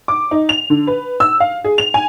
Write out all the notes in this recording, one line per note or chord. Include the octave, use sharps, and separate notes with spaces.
D6
D#4
F7
D3
B4
E6
F5
G#4
F7
G#5